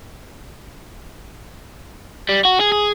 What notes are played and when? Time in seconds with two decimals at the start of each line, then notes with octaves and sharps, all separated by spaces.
2.29 G3
2.45 F#4
2.60 G#4
2.72 G#4